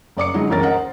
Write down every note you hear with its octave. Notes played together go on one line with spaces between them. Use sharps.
F#1 D5 D6 C#7
D3 F#3 G#3 D#4 E4 F#4
F#1 C#2 E3 C#4 A#4 A6
A#4 D#5 F#5
C5